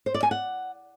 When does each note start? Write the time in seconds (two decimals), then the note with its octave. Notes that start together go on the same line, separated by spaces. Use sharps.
0.06 C5
0.14 D5
0.23 G#5
0.31 F#5